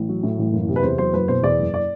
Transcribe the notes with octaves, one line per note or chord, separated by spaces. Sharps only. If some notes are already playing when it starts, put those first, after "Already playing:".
Already playing: A1
F#3
A2
A1
F#1
C3
B4
E2 C5
F#3 C5
F#1 B4
B2 C5
E2 D5
F#1
D5